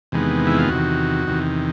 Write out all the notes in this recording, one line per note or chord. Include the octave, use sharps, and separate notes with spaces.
E2 C3 D#3 G#3 B3
E4
F4
E2 C3 D#3 F#4
E2 C3 D#3